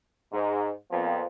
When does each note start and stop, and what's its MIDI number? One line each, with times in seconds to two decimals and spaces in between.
0.32 0.69 44
0.91 1.25 41
0.91 1.25 46
0.91 1.25 53
0.91 1.25 59
0.91 1.25 60